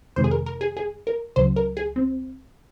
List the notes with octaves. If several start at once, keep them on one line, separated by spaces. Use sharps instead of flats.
F2 C3 D#3 G#3 C5
G#4
A#4
A#4
G#4
G#4
A#4
C#2 C#3 F#3 C5
A#4
G#4
C4